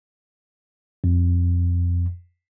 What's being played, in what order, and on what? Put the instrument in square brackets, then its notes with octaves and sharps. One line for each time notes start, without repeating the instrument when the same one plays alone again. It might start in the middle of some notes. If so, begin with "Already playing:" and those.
[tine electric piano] F2